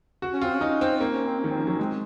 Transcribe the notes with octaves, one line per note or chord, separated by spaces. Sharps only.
F#4
C#4
C4 F4
C#4
D#4
C4
A#3 C4
C#4
C4
C#4
D#3
C4
F3 C#4
F#3 C#4
G#3 C4